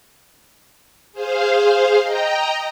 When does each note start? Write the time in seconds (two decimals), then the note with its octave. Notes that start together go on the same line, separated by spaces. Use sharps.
1.13 G#4 C5 F5
2.01 D#5 G5 A#5